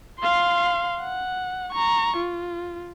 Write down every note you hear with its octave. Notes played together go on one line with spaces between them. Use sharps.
F5 C6
F#5
A#5 C#6
F4